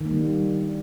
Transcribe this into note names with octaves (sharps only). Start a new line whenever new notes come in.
D#3
A#3
G3